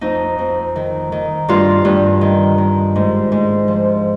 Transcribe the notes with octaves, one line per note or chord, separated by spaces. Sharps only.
F2 D#4
F2
D#3
D#3
G2 F4
G2
D#3
D#3
G#2
G#2
F3